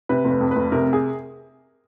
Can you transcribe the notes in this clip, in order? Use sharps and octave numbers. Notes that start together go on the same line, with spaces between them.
C3 B4
F1
B4
F2
F1 B4
C3 A#4
G#4